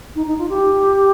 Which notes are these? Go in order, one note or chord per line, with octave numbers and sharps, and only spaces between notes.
D#4
D#4
F4
G4